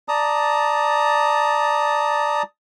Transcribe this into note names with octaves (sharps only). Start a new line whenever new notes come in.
D5 A5 A#5 D#6